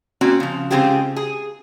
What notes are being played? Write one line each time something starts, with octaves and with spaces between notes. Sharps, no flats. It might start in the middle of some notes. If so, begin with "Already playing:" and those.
A#3 C4 C#4 F#4
C#3 F3
C#3 G#3 C4 F4 G4 G#4
G#4